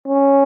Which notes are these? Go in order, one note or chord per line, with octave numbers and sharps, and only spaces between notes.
C#4